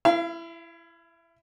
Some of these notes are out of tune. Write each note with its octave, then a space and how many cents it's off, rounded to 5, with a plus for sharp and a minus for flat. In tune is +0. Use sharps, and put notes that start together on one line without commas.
E4 +20 F5 -35